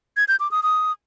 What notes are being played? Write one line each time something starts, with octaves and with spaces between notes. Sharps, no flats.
G#6
G6
D6
D#6
D#6